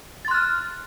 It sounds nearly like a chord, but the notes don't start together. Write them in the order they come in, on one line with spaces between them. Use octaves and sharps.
A6 C6 F#6 F6